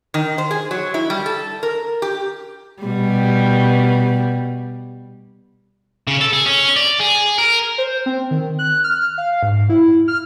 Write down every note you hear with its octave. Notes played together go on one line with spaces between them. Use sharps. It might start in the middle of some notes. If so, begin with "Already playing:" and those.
D#3
C5
G#4
F#3
E4
G3
A4
A#4
G4
B2 G3
C#3
A4
G#4
C#4
D5
G#4
A#4
C5
C4
D#3
F#6
F6
F5
G#2
E4
F6